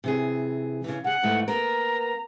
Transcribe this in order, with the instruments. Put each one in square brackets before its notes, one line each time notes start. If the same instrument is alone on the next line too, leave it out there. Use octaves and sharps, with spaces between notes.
[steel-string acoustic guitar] C3 E3 G#4
C#3 E3
[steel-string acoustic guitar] C#3 G#4 [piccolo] F#5
[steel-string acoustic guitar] G#2 E3 A3
[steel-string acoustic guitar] A#3 B3 A#4 [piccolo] A#5